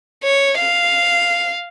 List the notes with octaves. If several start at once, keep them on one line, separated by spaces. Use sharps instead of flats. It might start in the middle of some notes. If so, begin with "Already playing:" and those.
C#5
F5